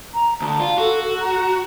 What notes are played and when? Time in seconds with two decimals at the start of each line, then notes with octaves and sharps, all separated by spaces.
0.14 A#5
0.42 D2 A5
0.60 F4
0.78 F#4 A4
1.03 A4
1.20 A#5